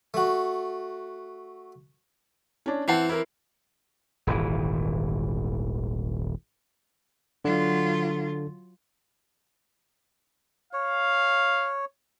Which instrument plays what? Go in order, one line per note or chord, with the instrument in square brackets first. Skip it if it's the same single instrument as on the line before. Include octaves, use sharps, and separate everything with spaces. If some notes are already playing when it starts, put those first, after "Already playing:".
[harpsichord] A3 F#4
[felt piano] C#4 D4
[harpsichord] E3 C4 [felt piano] F#5 A5 C7
[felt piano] E4 A#4
[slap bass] D#1 G#1 E3
[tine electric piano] D3 [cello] F#3 F4
[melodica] C#5 [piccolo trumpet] F5